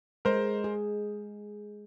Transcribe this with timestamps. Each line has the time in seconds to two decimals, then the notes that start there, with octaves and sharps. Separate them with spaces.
0.25 G#3 A#4 C5
0.64 G#4